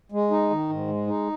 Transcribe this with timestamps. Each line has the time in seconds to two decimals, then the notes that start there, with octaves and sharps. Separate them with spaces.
0.12 G#3
0.31 D#4
0.50 D#3
0.69 G#2
0.88 G#3
1.07 D#4